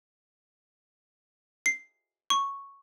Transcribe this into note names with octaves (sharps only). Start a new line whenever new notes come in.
C7
C#6